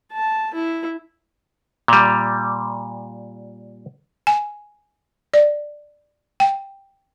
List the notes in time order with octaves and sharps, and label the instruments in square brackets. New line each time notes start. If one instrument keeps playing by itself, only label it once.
[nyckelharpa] A5
E4
[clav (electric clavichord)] A#2 G3
[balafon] G#5
D5
G5